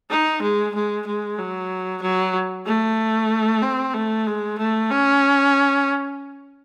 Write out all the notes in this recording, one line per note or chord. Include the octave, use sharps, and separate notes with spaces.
D#4
G#3
G#3
G#3
F#3
F#3
A3
C4
A3
G#3
A3
C#4